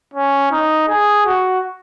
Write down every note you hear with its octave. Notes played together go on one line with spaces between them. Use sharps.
C#4
D#4
G#4
F#4